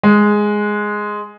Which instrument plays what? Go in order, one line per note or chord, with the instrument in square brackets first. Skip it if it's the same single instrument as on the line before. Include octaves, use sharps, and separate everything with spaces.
[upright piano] G#3